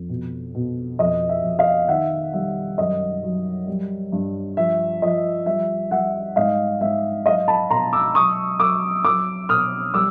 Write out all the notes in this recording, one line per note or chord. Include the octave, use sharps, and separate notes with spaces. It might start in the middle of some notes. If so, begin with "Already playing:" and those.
Already playing: F2
B2
B2
F2 D#5
E5
F2
D#5 F5
D#3 E5 F#5
G3 E5
F#2 D#5
F#3
G3
G2
F3 E5
F3 D#5
G3 E5
G3 E5 F#5
G#2 D#5 F5
G#2 E5
F#3 D#5 F5
A5 B5
B2 A#5 C6
D6 E6
F#3 C#6 D#6
F#3 D6 E6
F#3 D6 E6
B2 D#6 F6
G3 D6 E6